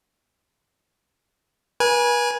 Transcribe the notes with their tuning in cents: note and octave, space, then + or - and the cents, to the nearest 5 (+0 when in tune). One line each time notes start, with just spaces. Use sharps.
B4 -40 G#5 +0